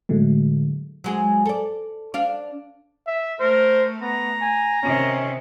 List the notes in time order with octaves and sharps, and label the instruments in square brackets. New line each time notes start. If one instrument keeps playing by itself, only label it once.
[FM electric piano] A2 D3 F#3 G#3 A3
[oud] F#3 G#3 G#4
A4 D5
D4 F5
[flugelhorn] E5
[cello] A3 [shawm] A#4 [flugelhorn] C5
[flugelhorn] B3 [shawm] A#5
[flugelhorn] G#5
[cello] C3 D#3 [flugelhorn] C#4